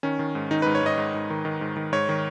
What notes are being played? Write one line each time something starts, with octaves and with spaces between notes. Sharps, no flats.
D#3 C#4
D#3
G#2
D#3 D#4
B4
G#2
C#5
G#2 D#5
G#2
G#2
D#3
D#3
G#2
D#3
G#2 C#5
D#3